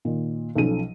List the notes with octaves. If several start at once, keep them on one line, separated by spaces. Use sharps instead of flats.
A#2 D#3
B1 F3 C#4 A4 D#7